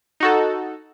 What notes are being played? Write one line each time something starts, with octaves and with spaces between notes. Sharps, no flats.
D#4 F#4 A4